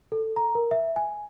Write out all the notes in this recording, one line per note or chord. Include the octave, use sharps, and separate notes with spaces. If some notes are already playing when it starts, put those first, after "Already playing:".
A4
A#5
A#4
E5
G#5